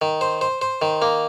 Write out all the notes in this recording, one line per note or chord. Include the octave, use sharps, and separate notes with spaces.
D#3
C5
C5
C5
D#3
A#3